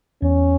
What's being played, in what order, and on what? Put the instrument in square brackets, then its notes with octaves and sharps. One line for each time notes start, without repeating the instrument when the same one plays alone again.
[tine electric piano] E2 [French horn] C#4